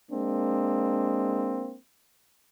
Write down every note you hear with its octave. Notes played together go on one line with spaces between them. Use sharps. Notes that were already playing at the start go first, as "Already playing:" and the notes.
G#3 A#3 C4 D4